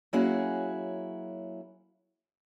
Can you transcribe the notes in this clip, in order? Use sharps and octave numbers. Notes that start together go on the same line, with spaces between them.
F#3 A#3 C#4 E4 F#4 G#4